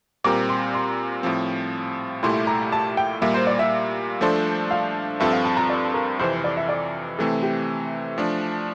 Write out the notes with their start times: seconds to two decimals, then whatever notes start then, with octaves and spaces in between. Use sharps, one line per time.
0.24 A#2 G3 C4 G4 A#4 D6
0.49 C6
0.74 C6
1.23 A2 F3 C4
2.23 C2 A#2 A3 E4 G4 C6
2.47 A#5
2.72 A5
2.97 G5
3.22 A#2 G3 A#3 E5
3.34 C5
3.47 D5
3.59 E5
4.21 F3 A3 D4 A4 C5
4.71 F5
5.20 G2 F3 C4 F4 A4 E5
5.33 F5
5.45 A5
5.57 A#5
5.70 D5
5.94 A#4
6.19 F2 C3 E3 C5
6.32 C5
6.44 D5
6.57 E5
6.69 D5
7.19 C3 E3 A3 C4 A4
7.43 G4
8.18 F3 A3 D4